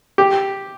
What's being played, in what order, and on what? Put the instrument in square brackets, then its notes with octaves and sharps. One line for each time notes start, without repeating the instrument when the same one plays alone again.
[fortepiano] G4